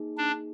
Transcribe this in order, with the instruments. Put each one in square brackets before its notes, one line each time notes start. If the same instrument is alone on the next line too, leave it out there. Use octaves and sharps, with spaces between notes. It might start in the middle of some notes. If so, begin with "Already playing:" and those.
Already playing: [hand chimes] A#3 D#4 G#4
[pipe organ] D4